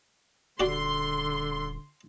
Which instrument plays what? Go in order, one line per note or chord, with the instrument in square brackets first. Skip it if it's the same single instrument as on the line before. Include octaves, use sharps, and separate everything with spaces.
[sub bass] D#1 [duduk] D3 [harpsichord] F#4 G4 D5 [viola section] C6